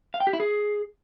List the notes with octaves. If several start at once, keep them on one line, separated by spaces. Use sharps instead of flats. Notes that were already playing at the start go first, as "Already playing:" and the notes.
F5
G5
G4
E4
G#4